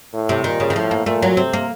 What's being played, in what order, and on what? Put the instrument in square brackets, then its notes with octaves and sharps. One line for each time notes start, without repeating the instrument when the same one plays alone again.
[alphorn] A2
[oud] C3
[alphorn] A#2 [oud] D#3
[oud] C#3
D#3
[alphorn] A2 [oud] F3
[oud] A#3
[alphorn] A#2 [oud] A3
[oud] F#3
[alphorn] C3 [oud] C4
[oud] A#3